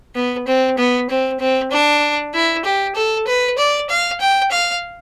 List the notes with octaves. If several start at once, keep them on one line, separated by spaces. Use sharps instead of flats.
B3
C4
B3
C4
C4
D4
E4
G4
A4
B4
D5
F5
G5
F5